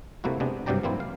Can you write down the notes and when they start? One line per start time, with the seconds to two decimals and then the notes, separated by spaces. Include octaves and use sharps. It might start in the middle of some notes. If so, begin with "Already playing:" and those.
0.24 C3 A3 A#3 E4 F#4
0.40 C3 G#3 B3 D4
0.66 G2 C3 F#3 D5 G5 A#5
0.83 E3 A#3 C4 E4
1.00 F5